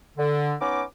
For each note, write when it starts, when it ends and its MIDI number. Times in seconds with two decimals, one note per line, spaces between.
0.18 0.54 50
0.61 0.83 59
0.61 0.83 61
0.61 0.83 63
0.61 0.83 86